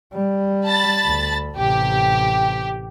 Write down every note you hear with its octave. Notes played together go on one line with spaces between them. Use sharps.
G3
A5 B5 A6
D2
A1 C3 G4